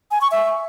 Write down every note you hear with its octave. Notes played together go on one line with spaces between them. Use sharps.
G#5
C#6
E5